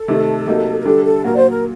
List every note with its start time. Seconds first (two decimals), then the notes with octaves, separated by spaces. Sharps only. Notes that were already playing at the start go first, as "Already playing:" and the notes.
Already playing: A4
0.08 C3 D#3 A3
0.47 C3 F#3 A#3 D#4
0.80 A#4
0.85 D3 G3 D4 G4 A4
1.05 A4
1.24 A#2 F#3 A#3 F#4 A#4
1.32 D5
1.37 C5
1.50 A#4